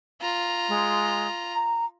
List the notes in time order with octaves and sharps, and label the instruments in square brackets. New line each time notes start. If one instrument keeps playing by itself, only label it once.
[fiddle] F4 A#5
[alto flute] G#3
A#5